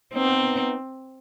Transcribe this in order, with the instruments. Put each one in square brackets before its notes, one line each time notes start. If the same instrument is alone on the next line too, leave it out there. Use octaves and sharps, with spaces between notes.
[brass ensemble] B3 D#4 [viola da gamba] C4